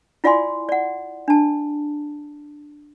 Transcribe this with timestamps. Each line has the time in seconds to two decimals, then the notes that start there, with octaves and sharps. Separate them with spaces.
0.24 E4 F4 D5 F5 G#5 C6
0.69 D5 F#5
1.28 D4 A5